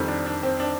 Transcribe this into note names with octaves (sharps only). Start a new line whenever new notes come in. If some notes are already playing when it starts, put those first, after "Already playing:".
Already playing: F2 D#3 G3 C4
D4
D4
C4
D4